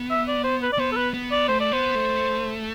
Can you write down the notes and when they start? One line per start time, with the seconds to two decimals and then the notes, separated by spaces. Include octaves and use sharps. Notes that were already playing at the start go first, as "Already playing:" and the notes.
Already playing: B3
0.10 E5
0.27 D5
0.44 C5
0.62 B4
0.72 D5
0.79 B3 C5
0.92 A4
0.97 B4
1.14 B3
1.31 D5
1.48 A3 C5
1.60 D5
1.72 B3 C5
1.95 A3